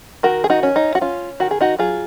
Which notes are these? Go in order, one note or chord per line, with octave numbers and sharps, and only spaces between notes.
D#3 F#4 A#4
G#4
D#4 F#4
C#4
D#4
F#4
C#4 F4
D#3 F#4
G#4
D#4 F#4
F#3 F4 G#4